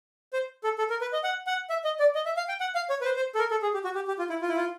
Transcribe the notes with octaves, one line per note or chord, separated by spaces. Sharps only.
C5
A4
A4
A#4
B4
D#5
F#5
F#5
E5
D#5
D5
D#5
E5
F5
G5
F#5
F5
C#5
B4
C5
C5
A4
A#4
A4
G#4
G4
F#4
G4
G4
F4
E4
F4
E4
F4